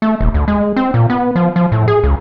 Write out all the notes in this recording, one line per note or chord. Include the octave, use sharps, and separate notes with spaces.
A3
D#1
D2
G#3
C4
A#2
B3
F3
F3
A2
G#4
C#2